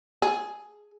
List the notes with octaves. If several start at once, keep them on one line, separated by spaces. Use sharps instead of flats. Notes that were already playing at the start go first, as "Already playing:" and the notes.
G#4